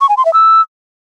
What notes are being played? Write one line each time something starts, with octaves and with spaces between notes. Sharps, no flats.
C#6
G#5
C6
E5
E6